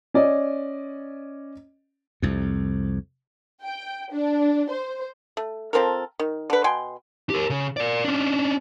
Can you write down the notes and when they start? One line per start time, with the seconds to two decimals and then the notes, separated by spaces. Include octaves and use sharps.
0.14 C#4 D5 D#5
2.22 C2 F2
3.64 G5
4.12 D4
4.70 C5
5.37 A3
5.73 F3 C4 A4 A#4
6.19 D#3
6.50 D3 B4
6.64 B2 G5 G#5 C6
7.30 G4 A#4
7.50 C#3
7.77 A#4 D5
8.04 C#4 D4